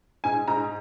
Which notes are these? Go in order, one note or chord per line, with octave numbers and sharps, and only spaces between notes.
G#2 G#5
G#2 A#5